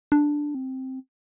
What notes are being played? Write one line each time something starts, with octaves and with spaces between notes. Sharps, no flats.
D4
C4